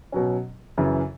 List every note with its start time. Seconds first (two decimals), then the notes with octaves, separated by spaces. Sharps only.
0.12 B2 F#3 C#4
0.77 F#2 C#3 E3